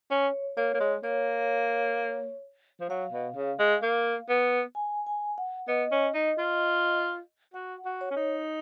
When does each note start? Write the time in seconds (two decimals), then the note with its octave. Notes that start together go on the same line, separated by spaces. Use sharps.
0.11 C#4 C#5
0.57 A#3 C#5
0.74 A#3
0.80 G#3
1.04 A#3 C#5
2.80 F3
2.89 F#3 F5
3.12 B2
3.36 C#3
3.59 G#3
3.83 A#3
4.29 B3
4.75 G#5
5.07 G#5
5.38 F#5
5.68 B3 D#5
5.92 C#4
6.14 D#4
6.38 F4
7.54 F#4 F#5
7.85 F#4
8.01 C#5
8.11 C#4
8.16 D#4